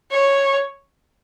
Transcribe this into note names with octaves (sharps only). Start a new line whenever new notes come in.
C#5